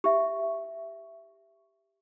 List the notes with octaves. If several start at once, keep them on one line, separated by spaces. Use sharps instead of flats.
G4 E5